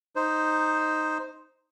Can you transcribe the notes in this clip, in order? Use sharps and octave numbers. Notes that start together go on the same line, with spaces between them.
D#4 C5